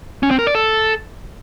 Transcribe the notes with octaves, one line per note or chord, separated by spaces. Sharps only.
C#4
C4
A#4
D5
A4